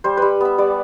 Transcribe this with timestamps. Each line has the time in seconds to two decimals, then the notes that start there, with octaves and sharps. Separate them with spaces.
0.04 G3 C5
0.17 G3 B4
0.41 B3 E5
0.58 G3 D5